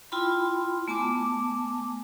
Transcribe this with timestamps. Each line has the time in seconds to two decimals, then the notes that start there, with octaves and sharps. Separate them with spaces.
0.12 E4 F4 G5 B5 C6
0.88 A3 B3 G#5 A5 D6